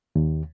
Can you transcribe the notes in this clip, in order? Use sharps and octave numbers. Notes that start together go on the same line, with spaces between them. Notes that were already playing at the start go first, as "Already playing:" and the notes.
D#2